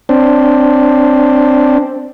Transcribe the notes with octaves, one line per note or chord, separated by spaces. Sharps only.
C4 D4